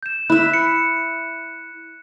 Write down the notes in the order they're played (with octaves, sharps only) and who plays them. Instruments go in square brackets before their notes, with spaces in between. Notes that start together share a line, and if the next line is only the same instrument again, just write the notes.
[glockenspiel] G6 E7
[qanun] E4 E5 [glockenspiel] F#6
[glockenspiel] C#7